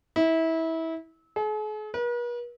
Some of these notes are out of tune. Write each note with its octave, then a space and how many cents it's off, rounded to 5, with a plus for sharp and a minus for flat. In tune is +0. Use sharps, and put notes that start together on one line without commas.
E4 -25
G#4 +45
B4 -45